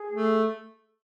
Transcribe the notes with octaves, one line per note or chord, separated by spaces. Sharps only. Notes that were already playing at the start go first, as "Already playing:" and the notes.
Already playing: G#4
A3